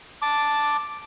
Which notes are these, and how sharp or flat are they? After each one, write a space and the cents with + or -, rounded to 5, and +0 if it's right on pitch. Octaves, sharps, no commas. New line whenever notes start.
A5 +0 D6 +0